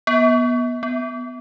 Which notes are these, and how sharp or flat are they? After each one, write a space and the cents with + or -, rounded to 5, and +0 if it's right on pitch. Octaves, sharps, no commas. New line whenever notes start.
B3 -20
B3 +5